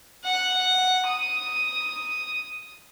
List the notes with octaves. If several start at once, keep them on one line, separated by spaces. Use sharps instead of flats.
F#5
D#6